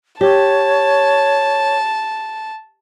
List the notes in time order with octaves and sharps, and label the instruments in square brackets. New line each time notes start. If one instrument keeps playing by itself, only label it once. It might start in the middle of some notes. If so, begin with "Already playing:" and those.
[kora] G4 [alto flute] C#5 [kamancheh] A5